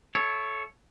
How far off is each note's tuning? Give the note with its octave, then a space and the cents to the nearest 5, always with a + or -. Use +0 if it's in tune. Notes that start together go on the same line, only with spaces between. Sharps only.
E4 +20 A4 -20 C#5 +0